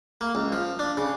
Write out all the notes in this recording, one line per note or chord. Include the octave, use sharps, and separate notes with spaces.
A#3
C#2
F3
D4
C#3